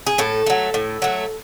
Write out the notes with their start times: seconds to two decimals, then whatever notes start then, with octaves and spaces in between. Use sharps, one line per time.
0.06 G#4
0.18 A2 A4
0.46 F#3 A3
0.74 A2
1.02 F#3 A3